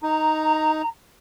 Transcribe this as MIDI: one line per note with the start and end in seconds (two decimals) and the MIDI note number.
0.03 0.82 63
0.03 0.87 82